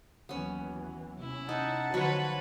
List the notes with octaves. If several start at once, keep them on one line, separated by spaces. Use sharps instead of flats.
D#2 E3 F#3 B3 C#4
C3 C#4 E4
D#4 F#5 A5
D3 F3 F#3 B4 C#5 C#6